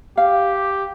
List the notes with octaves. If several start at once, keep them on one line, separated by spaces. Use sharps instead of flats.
G4 F5